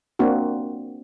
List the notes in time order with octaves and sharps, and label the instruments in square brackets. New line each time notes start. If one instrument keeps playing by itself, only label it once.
[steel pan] A#3 C4 D4 F#4